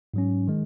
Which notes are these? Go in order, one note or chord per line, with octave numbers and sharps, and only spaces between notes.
G#2 F#3 C#4
D#3 G#3